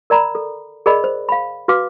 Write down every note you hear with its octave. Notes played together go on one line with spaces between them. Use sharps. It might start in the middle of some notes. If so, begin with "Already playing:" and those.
A#4 D5 A#5 B5
A4
G#4 A#4 D5 D#5 B5
C5
F5 B5
F#4 B4 F5 D6